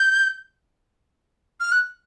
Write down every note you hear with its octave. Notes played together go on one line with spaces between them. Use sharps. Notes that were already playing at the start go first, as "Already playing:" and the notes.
Already playing: G6
F6
F#6